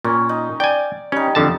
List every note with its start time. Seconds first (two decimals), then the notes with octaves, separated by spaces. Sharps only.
0.04 A#2 C#4
0.29 D#4
0.60 D5 G5 G#5
1.12 G3 C#4 D#4
1.35 F2 D3 A5